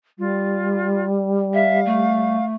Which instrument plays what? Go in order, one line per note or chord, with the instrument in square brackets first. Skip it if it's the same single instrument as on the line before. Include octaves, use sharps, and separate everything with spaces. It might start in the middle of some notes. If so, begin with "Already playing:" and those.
[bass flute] G3 [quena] F4
[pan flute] E5 [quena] F5
[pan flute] A3